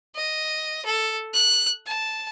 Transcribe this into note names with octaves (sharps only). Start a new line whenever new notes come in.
D#5
A4
F#6
A5